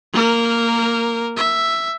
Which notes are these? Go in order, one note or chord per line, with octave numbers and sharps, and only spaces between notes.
A#3 A#4
E5